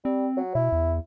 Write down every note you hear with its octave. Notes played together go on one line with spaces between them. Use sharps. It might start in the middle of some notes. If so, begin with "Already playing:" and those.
G3 C4
F#3
B2 E4
E2